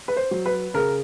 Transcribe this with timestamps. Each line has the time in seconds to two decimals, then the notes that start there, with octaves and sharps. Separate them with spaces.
0.08 B4
0.17 C5
0.31 F#3
0.46 B4
0.74 C#3 A#4